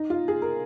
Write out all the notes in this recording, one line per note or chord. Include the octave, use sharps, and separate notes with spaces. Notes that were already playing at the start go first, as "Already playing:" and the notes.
Already playing: D#4
F4
G#4
A#4